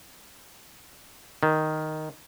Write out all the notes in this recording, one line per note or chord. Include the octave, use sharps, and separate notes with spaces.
D#3